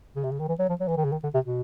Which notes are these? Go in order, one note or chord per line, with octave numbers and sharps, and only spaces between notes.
C#3
C3
C#3
D#3
E3
F#3
F3
F#3
E3
D#3
C#3
D#3
D3
C3
B2